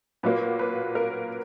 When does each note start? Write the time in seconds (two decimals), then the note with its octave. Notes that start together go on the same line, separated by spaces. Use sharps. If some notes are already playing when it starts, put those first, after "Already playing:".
0.23 A#2 F#3 A#3 B4
0.59 B4
0.95 A#4